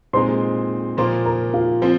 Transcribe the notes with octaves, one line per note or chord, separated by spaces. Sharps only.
A#2 G#3 C4 D#4 G#4 C5 C6
A#2 F3 A#3 C5 C6
A#4 A#5
F4 F5
F3 C4